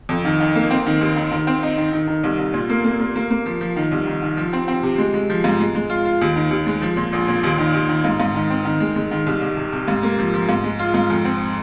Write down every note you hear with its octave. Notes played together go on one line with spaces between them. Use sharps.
F2
D#3
D#3
A#3
C4
D#3
D#2
D#3
D#3
C4
D#4
D#3
D#3
D#3
C2
C2
A#2
A#3
A#3
A#3
A#3
A#3
F3
F3
D#3
C2
D#3
D#3
F3
C4
C4
C3
G#3
G#3
F3
G#2
G#3
G#3
F4
F4
D#2
D#3
D#2
G#3
F3
A#2
A#1
A#2
D#2
D#3
D#2
D#3
G#2
G#2
D#3
C4
D#3
G#3
G#3
D#3
C2
C2
C3
C3
G#2
A#3
F3
F3
G#2
G#3
F4
G#2
F2
C4